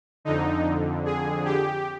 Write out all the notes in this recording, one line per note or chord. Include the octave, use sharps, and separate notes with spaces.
F2 D3 D#4
G#4
G4